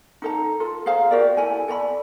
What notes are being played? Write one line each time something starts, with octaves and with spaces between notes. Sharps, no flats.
D#4 A4 A#5
F4 A4
G#4 C5 F5 A#5
F#4 G4 A#4 D5
E4 A4 G#5
A4 D5 A#5 B5